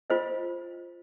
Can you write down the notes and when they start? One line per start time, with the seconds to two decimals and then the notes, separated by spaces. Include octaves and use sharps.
0.10 F4 C5 D#5